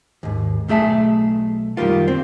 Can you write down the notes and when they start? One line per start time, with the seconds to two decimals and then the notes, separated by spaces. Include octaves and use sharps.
0.23 D#2 G#2
0.68 B1 A3 G#4 E5 A5
1.77 F#2 D#3 E3 G3 A#3 F4
2.08 C4